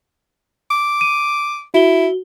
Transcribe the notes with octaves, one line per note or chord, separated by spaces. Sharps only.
D6
D#7
E4 F#4 G7